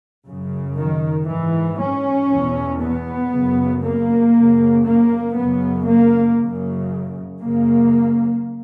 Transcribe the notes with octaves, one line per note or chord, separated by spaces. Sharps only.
F#2 C#3
D#3
G#2 E3
C#4
E2 B2
B3
F#2 C#3
A#3
F#2 C#3
A#3
F#2 C#3 B3
A#3
F#2 C#3
F#2 C#3 A#3